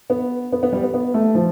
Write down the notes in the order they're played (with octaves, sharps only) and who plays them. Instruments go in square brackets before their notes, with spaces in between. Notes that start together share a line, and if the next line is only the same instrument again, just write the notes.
[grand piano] B3
B3
B3
G3
B3
B3
A3
F3